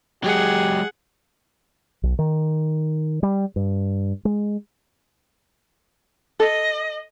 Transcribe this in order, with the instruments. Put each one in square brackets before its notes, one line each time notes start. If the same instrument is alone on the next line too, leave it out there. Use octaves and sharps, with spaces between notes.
[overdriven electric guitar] F#3 G#3 [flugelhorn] G4 [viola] G#4 F#5
[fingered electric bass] B1
D#3
G3
G2
G#3
[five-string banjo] A4 [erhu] D#5